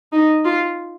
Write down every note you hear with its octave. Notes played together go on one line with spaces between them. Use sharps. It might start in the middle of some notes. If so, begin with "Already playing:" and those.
D#4
F4